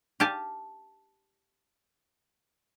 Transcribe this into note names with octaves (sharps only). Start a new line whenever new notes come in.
G4 F5 G#5 A5